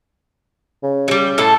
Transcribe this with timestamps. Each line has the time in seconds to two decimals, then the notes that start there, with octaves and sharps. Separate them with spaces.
0.83 C#3
1.08 F#3 G3
1.38 A2 A3 A4